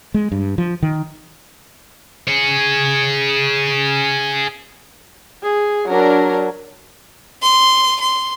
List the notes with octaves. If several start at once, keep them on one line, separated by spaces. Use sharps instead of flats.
G#3
G2
F3
D#3
G#4 C#5
G#4
F#3 D4 A#4
C6
C6